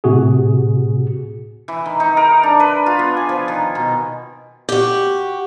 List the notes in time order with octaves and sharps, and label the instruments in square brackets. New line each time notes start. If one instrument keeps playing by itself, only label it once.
[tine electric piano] A2 C3 F#4 G#4
[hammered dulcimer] E3
D#3
D#4
A#4
D4
B4
F4
B3
G#5
F3
D#3
B2
[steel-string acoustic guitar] F#4 G4